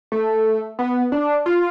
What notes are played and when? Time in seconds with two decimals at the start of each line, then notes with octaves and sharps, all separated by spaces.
0.12 A3
0.79 B3
1.12 D4
1.46 F4